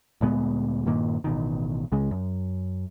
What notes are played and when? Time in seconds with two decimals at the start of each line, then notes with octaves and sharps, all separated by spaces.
0.21 D2 A#2 G#3 B3
0.86 G2 A#2 D#3 A#3
1.24 A1 B2 D#3
1.92 C#2 C#3 G#3
2.11 F#2